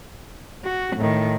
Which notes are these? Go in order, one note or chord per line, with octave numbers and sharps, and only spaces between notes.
F#4
A2 D#3